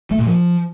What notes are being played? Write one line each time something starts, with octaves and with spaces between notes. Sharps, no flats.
A3
A#2
F3